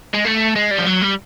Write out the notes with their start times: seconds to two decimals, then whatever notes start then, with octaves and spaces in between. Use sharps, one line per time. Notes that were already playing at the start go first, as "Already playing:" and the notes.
0.14 G#3
0.25 A3
0.56 G#3
0.71 G3
0.79 F3
0.87 F#3
1.02 G3